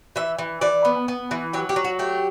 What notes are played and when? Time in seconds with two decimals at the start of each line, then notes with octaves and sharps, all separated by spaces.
0.16 E3 E5
0.38 E3
0.61 E3 D5
0.85 B3
1.08 B3
1.31 E3
1.53 F#3 G4
1.69 G4
1.76 F#3
1.84 F#4
1.99 A3 G4